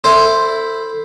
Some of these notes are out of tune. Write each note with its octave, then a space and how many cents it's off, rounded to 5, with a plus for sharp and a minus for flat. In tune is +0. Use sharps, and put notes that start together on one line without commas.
E4 +0 A4 +25 C5 +0